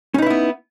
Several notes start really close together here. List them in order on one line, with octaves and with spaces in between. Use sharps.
C#4 D#4 B4 E4 B3